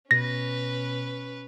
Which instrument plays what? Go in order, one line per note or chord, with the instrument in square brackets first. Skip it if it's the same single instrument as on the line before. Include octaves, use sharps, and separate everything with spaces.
[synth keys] B2 [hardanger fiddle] C#4 B4 [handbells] A#6